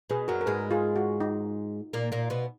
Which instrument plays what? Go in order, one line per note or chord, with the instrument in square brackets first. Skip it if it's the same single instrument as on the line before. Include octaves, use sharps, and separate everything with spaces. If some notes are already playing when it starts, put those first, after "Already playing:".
[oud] B2 [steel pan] G#4 B4
[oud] F#2 F#3 [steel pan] F#4 A#4
[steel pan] A#4
[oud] G#2 G#3 [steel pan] G#4 B4
[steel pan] F4 G#4
F#4
D#4
[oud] A#2 A#3
A#2 A#3
B2 B3